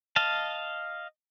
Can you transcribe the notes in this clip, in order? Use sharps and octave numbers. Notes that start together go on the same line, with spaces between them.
D#5 F5 A5